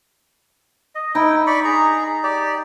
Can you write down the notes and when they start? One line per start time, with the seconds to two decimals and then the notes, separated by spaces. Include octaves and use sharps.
0.95 D#5
1.15 D#4 E4 G5
1.47 D5 B5 C#6
1.65 G#4 A#5
2.23 G4 D5